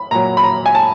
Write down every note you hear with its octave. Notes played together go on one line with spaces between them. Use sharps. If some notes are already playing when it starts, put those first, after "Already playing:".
Already playing: B5
A#2 F#3 A#5
B5
A#5
G#5
A5